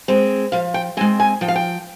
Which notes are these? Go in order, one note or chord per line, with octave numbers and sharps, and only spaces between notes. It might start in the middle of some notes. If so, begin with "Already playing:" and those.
G#3 C4
F3 F5
G5
G#3 C4 G#5
G#5
F3 G5
F5
G5